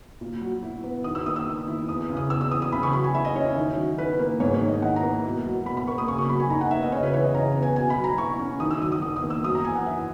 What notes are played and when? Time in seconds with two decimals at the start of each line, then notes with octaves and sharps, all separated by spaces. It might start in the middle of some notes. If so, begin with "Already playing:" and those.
0.21 A#2
0.41 F#3
0.63 E4
0.83 B3
1.04 D#3 D#6
1.15 E6
1.26 A#3 D#6
1.36 E6
1.47 D#3
1.67 E4
1.88 E2 D#6
2.10 C#3
2.17 D#6
2.30 E2 E6
2.41 E6
2.51 E3 D#6
2.62 D#6
2.72 C#3 B5
2.83 C#6
2.93 F#3 B5
3.04 G#5
3.14 E4 E5
3.25 D#5
3.35 C#4 C#5
3.46 C#5
3.56 D#3
3.77 F#3
3.98 E4 B4
4.19 A#3
4.40 G#2 C#5
4.54 C#5
4.61 D#3
4.68 D#5
4.82 E4 F#5
4.96 A#5
5.03 A#3
5.24 B2
5.45 F#3
5.66 B2 B5
5.77 B5
5.87 A#3 C#6
5.98 D#6
6.08 C#3 C#6
6.18 C#6
6.29 F#3 B5
6.40 G#5
6.50 D#4 A#5
6.61 F#5
6.71 B3 E5
6.82 D#5
6.92 C#3 C#5
7.03 B4
7.14 E3 C#5
7.24 D#5
7.34 C#3 A#5
7.55 B3
7.63 G#5
7.76 B2 G#5
7.90 B5
7.97 F#3
8.04 A#5
8.18 E4 C#6
8.39 C#4
8.60 D#3 D#6
8.71 E6
8.81 F#3 D#6
8.92 D#6
9.02 D#3 D#6
9.16 D#6
9.23 A#3
9.30 E6
9.44 F#2 D#6
9.55 A#5
9.65 E3 G#5
9.75 F#5
9.86 E4 E5